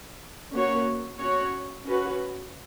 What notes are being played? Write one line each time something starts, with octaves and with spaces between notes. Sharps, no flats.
A#3 C#4 F#4 C#5
C#4 F#4 C#5
C#4 F#4 B4